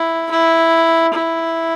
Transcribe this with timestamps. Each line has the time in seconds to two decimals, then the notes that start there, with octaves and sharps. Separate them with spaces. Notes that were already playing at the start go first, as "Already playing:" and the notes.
Already playing: E4
0.31 E4
1.14 E4